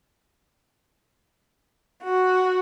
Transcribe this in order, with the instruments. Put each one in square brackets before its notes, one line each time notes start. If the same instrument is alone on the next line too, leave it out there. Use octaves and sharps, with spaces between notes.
[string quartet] F#4